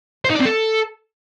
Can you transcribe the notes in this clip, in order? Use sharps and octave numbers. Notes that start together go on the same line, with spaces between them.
C5
D#4
D5
C4
A4